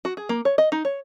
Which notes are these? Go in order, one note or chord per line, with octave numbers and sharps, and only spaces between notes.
F#4
G#4
A#3
C#5
D#5
D#4
C#5